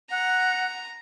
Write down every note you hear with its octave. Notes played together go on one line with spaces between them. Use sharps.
F#5 A#5